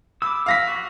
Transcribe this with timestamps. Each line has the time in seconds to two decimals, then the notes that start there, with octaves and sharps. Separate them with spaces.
0.22 B5 D6 E6
0.46 F5 A#6 B6
0.67 F#4